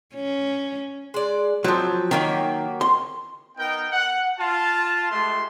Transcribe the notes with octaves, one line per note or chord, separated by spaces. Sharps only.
C#4
G#3 D5
F3 F#3 C4
D#3 F#3 A#3 G4
C6
B3 D#4 A#4 G5
F#5
F4 A5
G#3 A3 F4 G4 C6